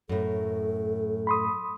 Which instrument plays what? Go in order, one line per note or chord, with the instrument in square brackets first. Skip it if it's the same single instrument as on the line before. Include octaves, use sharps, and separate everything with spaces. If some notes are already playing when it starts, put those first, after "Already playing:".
[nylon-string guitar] F#2 A2 [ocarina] A4
[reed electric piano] B5 C6 D#6